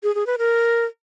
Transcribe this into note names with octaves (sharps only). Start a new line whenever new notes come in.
G#4
G#4
B4
A#4